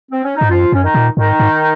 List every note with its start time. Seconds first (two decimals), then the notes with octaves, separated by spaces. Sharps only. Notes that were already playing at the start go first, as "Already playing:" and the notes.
0.11 C4
0.24 C#4
0.37 G#2 D#4
0.50 F#2 F3 F4
0.72 F#2 C#4
0.83 D#3 D#4
0.94 A#2
1.17 G#2 D#3 D#4
1.40 G#2